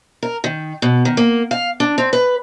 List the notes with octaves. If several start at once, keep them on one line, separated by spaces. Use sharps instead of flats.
A#4
D#3
B2
D#3
A#3
F5
D4
C4
B4